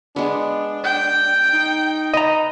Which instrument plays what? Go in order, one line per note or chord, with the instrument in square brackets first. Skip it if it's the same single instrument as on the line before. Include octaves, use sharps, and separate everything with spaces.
[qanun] G#3 B3 [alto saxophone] D4
[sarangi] G5
[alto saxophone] D#4
[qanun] B4 [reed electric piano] D#5 A#5